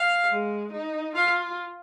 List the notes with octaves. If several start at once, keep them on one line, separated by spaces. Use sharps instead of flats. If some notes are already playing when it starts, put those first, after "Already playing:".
Already playing: F5
G#3
D#4
F4 F5